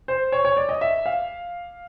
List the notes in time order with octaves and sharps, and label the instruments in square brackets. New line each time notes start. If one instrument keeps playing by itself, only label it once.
[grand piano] C5
C#5
C#5
D5
D#5
E5
F5